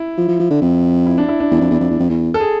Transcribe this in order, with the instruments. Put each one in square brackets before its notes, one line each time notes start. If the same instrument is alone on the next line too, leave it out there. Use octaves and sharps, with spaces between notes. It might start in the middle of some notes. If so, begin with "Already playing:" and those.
Already playing: [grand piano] E4
[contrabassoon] F3
F3
F3
D3
F2
[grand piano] E4
D4
E4
D4
[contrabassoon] E2
F2
E2
F2
E2
F2
E2
[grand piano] A4
G#4